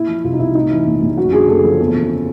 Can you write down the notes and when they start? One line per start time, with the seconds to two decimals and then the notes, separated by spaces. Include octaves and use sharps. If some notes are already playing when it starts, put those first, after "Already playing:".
Already playing: A#2 E4
0.08 F3
0.24 C2 F4
0.33 D#4
0.39 C2 E4
0.55 A2 D#4
0.71 E3 E4
0.87 A#1
1.02 A#1
1.17 F#2 F#4
1.32 D3 G#4
1.48 F#1 A4
1.64 F3
1.79 E2
1.94 C#3